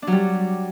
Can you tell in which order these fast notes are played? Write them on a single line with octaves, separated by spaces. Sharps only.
D4 F#3 G3